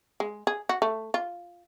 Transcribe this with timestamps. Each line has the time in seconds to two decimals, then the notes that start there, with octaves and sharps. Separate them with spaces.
0.20 G#3
0.47 G#4
0.69 F#4
0.82 A3
1.14 F4